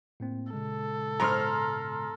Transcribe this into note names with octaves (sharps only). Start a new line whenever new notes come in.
A2 A#3 C4
A#2 C#3 G#3 A4
G#2 B3 C#5 A#5 C6 F6